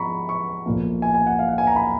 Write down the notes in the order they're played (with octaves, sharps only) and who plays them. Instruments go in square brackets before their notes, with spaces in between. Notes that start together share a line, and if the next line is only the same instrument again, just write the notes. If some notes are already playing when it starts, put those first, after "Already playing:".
Already playing: [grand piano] F3 G#3 B3 A#5 B5 C#6
C#6
B1 A#2 F3 A#3
G#5
G#5
F#5
F5
F#5
G#5
A#5
B5